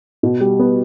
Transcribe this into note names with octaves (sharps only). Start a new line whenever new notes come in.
B2
G3
B3